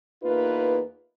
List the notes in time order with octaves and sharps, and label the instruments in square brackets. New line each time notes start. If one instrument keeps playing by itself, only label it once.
[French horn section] E2 A#3 D#4 F4 B4